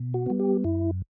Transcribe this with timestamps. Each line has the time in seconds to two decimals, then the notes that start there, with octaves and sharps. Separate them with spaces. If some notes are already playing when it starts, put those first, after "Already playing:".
Already playing: B2
0.14 F#4
0.26 G3 B3
0.40 G4
0.64 F#2 E4